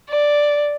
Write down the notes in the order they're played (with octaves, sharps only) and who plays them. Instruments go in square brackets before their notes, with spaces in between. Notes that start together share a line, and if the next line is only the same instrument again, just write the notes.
[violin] D5